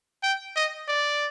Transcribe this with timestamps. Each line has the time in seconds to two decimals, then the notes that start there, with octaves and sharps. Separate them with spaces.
0.23 G5
0.56 D#5
0.88 D5